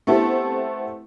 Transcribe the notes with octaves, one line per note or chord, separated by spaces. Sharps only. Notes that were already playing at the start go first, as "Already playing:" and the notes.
A3 B3 C4 E4 G4 A4